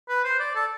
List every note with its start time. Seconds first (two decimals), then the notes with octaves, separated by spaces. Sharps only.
0.09 B4
0.25 C5
0.40 D5
0.56 A4